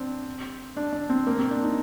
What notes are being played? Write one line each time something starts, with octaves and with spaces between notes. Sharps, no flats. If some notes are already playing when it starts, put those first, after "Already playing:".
Already playing: C4 D4
D4
D4
C4
A#3
C4
D4
D#4